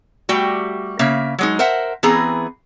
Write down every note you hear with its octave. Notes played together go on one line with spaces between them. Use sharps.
G3 A3 F#4 G4 G5
C#3 A#3 E5
F#3 G#3 D#4
A#4 C5 E5 F#5
E3 B3 C4 G#4 A#5